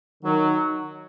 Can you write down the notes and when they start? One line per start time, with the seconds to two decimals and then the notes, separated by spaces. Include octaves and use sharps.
0.23 D#3 F#3